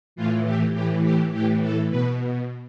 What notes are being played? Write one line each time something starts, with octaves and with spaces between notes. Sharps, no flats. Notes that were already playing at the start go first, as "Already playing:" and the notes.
A2 E3 F4
G4
A2 E3 G4
G4
A2 E3 G4
A4
B2 B4